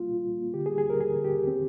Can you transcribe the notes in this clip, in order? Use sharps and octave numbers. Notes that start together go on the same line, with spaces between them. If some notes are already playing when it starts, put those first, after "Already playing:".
Already playing: C2 G3 A#3 F4
A#2
C2
A#3
D3 G4
G#4
G3
G#4
D#2 A#4
D#2 G#4
D3
G4
D#2
C4